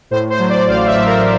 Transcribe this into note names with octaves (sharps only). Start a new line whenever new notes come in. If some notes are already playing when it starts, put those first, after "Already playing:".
A2 C5
C5
F#3
D5
A1 F5
E5
A2
A#4